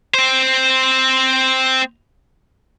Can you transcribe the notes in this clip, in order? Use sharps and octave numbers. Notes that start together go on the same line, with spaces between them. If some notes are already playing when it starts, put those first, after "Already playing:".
C4 C5